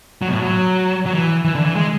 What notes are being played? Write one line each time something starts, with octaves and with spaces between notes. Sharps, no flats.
F#3
B2
A2
F#3
F#3
E3
E3
D3
E3
G#3